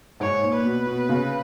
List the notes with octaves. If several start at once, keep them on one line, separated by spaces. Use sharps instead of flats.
G#2 C#5
A#2
B4
B2
B2
C#3